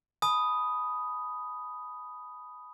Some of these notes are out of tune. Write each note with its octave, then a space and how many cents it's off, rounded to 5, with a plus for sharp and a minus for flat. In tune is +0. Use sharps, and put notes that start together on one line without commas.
G#5 +35 B5 +0 D#6 +0